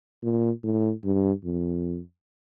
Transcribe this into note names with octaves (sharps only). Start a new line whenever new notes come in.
A#2
A2
G2
F2